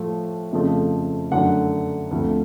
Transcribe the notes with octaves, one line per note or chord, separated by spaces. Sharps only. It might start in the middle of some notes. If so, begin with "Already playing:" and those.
Already playing: A2 F3 A3
F2 C#3 F3 A3
F#2 D3 F#3 A3 F#5
D2 C3 F3 A3